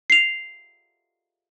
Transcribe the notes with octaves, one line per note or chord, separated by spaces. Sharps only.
C7 F7